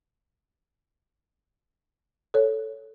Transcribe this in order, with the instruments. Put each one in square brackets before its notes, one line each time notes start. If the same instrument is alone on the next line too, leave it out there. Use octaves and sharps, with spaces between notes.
[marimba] A4 C#5